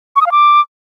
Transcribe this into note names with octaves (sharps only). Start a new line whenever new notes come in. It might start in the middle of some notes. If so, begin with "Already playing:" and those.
C#6
D#6
F5
D6